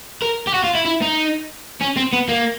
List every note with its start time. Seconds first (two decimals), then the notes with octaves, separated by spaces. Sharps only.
0.22 A#4
0.47 G4
0.54 F#4
0.64 F4
0.75 E4
0.85 E4
1.02 D#4
1.81 C#4
1.97 C4
2.13 B3
2.29 A#3